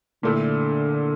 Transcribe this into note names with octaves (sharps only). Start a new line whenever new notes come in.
A#2 D3 A3 E4